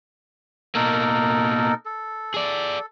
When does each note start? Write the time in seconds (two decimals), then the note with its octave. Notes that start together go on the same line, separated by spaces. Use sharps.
0.75 B2 A#3 D#4 A4 A#4
1.85 A4
2.34 G#4 D5